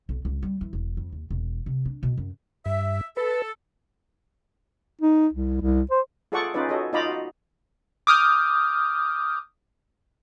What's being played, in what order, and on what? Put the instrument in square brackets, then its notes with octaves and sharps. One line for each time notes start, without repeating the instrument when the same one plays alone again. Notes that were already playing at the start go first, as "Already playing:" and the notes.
[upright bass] B1
C#2
G3
E3
E1
F2
D#2
E1
C3
D4
B2
F#2
[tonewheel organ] G2 [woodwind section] E5
[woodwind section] A4 [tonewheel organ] B4
[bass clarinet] D#4
C2
C2
C5
[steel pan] F4 G#4 A4 D5 F#5 C#6
C#4 D#4 F4 B4 D5
F#4 A4 C#5 D#5
D#4 F4 D5 D#5 A#5 B5
F#4
[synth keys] D6 D#6 F6 G6